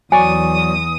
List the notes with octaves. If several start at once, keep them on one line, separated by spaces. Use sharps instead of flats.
E2 F#3 D5 G#5 C#6 D#6